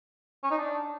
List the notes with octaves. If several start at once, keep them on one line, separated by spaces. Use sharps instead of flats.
C#4
D#4
D4